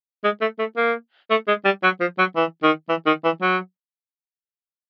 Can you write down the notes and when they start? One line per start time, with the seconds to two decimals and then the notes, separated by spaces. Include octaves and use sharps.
0.24 G#3
0.41 A3
0.59 A3
0.77 A#3
1.30 A3
1.48 G#3
1.65 G3
1.83 F#3
2.00 F3
2.18 F#3
2.36 E3
2.63 D#3
2.89 E3
3.06 D#3
3.24 E3
3.41 F#3